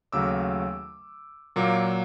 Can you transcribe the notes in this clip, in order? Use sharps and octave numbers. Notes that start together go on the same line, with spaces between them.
D#2 C#3 F#3 A3 D6 E6
A#2 F#3 A#3